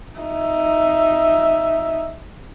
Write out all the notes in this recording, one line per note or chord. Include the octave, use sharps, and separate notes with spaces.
D#4 E5